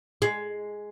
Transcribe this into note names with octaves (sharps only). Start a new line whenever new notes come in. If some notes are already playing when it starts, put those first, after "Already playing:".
G#3